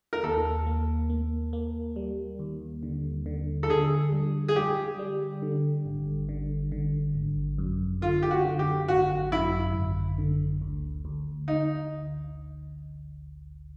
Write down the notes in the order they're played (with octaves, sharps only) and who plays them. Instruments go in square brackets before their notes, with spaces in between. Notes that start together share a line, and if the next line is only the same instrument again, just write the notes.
[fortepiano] A#4
[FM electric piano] D#2 [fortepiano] A4
[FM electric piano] A#3
A#3
A#3
G3
D#2
D3
D3
[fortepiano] A4
[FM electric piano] D3 [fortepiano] G#4
[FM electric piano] G3
[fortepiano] G#4
[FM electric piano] G3 [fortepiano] G4
[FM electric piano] G3
D3
G#1
D3
D3
G#1
F#2
[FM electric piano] D3 [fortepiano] F4
[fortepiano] G4
F#4
[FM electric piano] D3
[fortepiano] G4
[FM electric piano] G#1 [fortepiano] F#4
[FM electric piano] F#2 [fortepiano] E4
[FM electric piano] G#1
D3
D2
D2
[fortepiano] D#4